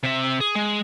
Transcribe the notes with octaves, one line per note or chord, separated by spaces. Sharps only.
C3 E5
G#4
G#3